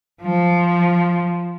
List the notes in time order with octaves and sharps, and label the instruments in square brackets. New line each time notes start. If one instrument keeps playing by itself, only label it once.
[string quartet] F3